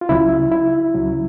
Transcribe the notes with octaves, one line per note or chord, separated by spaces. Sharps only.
F4
C#2 C#3 F#3 E4
E4
C#2 C#3 F#3